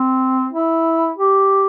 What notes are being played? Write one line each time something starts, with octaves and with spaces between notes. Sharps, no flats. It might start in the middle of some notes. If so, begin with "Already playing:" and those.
Already playing: C4
E4
G4